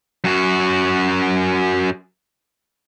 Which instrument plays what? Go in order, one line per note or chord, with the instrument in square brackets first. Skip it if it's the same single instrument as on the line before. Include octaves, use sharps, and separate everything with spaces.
[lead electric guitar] F#2 F#4